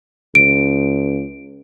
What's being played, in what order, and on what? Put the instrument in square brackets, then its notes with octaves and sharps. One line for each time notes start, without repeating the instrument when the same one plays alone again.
[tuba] C#2 [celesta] D7